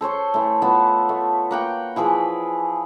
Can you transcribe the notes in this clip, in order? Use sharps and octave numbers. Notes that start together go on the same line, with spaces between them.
A4 C5 C#5 C6
E3 A3
B3 F4 F#5 A5
A3
A#3 F#5 G5
E3 F3 G#4 B4